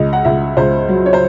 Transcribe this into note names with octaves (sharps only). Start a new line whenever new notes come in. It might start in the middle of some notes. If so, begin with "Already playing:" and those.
Already playing: C#2 D#5
F#5
C#2 E5
C#2 C5
F#3
C#5
C5